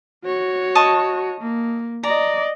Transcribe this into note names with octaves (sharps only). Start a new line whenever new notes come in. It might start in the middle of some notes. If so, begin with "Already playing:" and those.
F#4 C#5
D#5 A5 C#6
A#3
D5 D#5 A#5